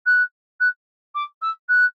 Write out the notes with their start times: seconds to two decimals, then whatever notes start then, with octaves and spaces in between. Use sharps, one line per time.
0.06 F#6
0.60 F#6
1.14 D6
1.41 E6
1.68 F#6